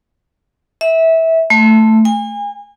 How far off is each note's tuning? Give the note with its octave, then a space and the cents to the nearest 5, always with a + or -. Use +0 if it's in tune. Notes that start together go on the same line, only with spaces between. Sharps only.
E5 -20
A3 +5
G#5 -35